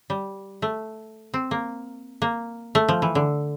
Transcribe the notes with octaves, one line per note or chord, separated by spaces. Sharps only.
G3
A3
C4
A#3
A#3
A3
F3
E3
D3